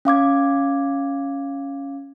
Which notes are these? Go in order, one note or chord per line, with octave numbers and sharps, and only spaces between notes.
C#4 F5 D6 G#6